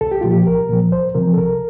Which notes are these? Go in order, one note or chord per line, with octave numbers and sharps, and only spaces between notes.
C2 A4
G4
A#2 F3 F4
G4
C2 A#4
A#2 F3
C2 C5
C3 F3 A#4
A4
C2 A#4